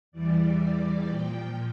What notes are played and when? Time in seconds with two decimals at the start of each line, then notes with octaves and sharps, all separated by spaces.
0.12 E2 E3 G3 D5
1.05 A#2 F3 G5